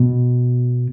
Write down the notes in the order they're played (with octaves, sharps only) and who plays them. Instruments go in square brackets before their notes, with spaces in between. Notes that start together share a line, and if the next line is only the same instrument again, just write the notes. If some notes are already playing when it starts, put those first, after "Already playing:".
Already playing: [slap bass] B2